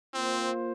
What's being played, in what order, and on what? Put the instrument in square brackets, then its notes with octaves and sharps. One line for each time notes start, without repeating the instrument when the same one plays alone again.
[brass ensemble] A#3 F4 C5 [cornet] C4